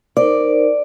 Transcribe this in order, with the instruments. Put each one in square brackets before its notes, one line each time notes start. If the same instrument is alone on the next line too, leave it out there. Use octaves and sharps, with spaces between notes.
[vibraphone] D#4 A#4 C5 [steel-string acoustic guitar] D5